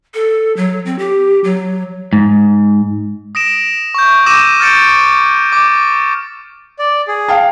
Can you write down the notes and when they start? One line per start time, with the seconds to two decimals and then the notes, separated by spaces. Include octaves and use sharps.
0.14 A4
0.57 F#3
0.86 C4
0.99 G4
1.44 F#3
2.13 G#2
3.35 D#6 A#6 D7 E7
3.95 C#6 G6
4.26 D6 E6 G6 A#6 D#7 E7
4.60 F6 G6 A6 C#7 D7
5.52 D6
6.79 D5
7.08 G#4
7.28 F5 G5 A5